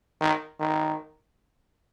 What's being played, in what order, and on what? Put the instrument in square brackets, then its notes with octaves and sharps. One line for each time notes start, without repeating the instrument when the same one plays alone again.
[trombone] D#3
D#3